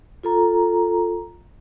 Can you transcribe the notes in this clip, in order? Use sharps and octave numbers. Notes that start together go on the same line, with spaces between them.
F4 A4 A#5